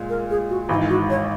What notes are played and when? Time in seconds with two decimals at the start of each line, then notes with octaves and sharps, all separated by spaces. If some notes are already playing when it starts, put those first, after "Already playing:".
Already playing: A#2 G#3
0.09 A#4
0.30 G#4
0.50 F#4
0.69 G#1 G#2 E3 E4
0.89 F#4
1.10 C#5